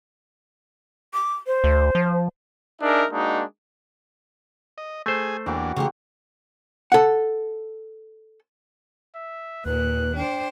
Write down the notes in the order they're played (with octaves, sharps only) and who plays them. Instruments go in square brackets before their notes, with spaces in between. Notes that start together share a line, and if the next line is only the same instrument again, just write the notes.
[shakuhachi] D6
C5
[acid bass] D2
F3
[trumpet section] D4 D#4 G#4 A#4 E5
G#3 A#3 D4 D#4 F#4
[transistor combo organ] D#5
[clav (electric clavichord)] A3 C5 [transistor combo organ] G#4 G#5
[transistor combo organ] E2 A#3 D4 [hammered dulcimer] E3 F#3 G4
[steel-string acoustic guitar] C#3 A3 G4 [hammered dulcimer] F#3 A#3 C4
[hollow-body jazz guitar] A4 F#5
[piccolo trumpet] E5
[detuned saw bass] D#2 [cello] A#2 [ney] B4 [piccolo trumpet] F#6
[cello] D4 C5 [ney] G5